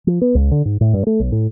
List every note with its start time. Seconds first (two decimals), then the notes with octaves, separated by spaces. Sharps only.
0.07 F3
0.21 B3
0.35 C#2
0.51 D3
0.65 G#2
0.81 A2
0.94 G2
1.07 A3
1.20 B1
1.32 A2